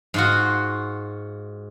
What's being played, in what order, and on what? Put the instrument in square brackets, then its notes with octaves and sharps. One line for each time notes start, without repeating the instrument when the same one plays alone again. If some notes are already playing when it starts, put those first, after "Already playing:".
[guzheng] G#2 F4 F#4